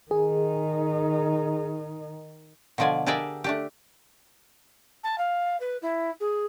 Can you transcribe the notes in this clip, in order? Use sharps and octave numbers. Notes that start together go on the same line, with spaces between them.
D#3 D#4 G#4
B2 D3 F3 D5 G#5
D4 G4 G#4 A#4 D5 E5
A3 D4 G4
A5
F5
B4
E4
G#4